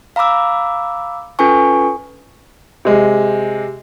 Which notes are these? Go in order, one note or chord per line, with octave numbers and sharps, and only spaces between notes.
F5 A#5 B5 D6 E6
C#4 F4 A4 B4 G#5 C#6
C3 G#3